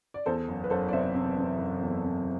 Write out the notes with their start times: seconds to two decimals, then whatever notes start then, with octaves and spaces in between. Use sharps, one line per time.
0.14 D5
0.26 E2 A4 C5
0.48 F#1
0.64 B4
0.70 F#1 A4 C5
0.88 D5
0.92 C3 C5 E5
1.15 C3
1.37 C3
1.58 F#1
1.81 E2
2.04 C3